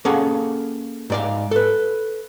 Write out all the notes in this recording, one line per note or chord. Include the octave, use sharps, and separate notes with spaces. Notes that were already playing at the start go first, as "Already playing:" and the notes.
A#3 C#4 G#4 A4 F5 F#5
G#2 D5 F5
A4 B4